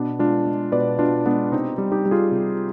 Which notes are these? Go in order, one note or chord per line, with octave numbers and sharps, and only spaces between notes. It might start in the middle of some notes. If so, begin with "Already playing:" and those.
Already playing: B2 B3 D4
G#3 D4 F4
G#3
B2 B4 D5
B2 D4 F4
G#3 B3 D4
C3 C4 D#4
G3
D#4 G4
G3
F4 G#4
C3